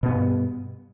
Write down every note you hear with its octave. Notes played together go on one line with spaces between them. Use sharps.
G2 B2 B3